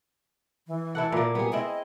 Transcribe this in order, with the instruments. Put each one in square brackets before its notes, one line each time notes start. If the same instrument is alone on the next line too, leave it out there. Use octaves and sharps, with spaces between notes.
[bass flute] E3
[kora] E4 A4 F#5
A#2 A#3
[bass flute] G3 [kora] B3 G#4
[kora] C4 E4 [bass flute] D#5